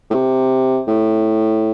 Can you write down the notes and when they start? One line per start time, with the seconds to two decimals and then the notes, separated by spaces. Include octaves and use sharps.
0.10 A2
0.14 C3
0.87 A2